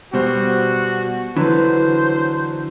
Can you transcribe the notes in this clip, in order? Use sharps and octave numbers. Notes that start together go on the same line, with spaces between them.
B2 G3 F#4 C5
D3 E3 F#3 B4 C5